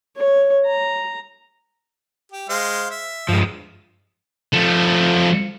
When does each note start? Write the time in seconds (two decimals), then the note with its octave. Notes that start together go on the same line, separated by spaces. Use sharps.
0.16 C#5
0.65 A#5
2.32 G4
2.49 G#3 C5 F5
2.91 E5
3.29 G2 F3 G#3
4.53 F3 A3